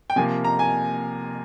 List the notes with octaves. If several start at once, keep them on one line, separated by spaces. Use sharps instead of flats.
G5
C3 F3 A#3 G#5
A#5
G#5